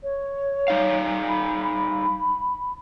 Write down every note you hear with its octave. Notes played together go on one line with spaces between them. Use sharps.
C#5
G3 D#4 F5
B5
B5